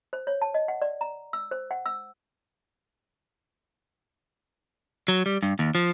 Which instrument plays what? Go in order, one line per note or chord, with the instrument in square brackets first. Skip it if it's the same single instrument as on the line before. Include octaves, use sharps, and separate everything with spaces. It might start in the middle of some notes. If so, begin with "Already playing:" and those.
[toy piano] C5
C#5
A5
D#5
F#5
D5
A#5
E6
C5
F#5
E6
[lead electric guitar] F#3
G3
G2
D#2
F3